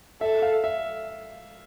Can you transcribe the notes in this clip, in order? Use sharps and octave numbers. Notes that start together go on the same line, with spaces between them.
A4 E5
F5
E5